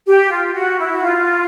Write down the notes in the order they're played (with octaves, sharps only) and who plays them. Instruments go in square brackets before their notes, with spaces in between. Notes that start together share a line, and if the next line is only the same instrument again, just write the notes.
[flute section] G4
F4
F#4
E4
F#4
F4